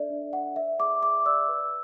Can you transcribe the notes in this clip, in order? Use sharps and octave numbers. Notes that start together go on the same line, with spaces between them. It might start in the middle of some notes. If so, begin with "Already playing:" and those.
Already playing: D4 A4 D5 E5
D4
D5 F#5
B4 E5
G#4 D6
G#4 D6
D5 E6
B4